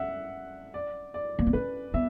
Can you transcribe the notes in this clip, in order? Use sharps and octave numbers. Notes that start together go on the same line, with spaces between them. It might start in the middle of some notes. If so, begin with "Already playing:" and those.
Already playing: C#4 E5 F#5
D5
D5
A#3
B3
C#4 B4
B3 E5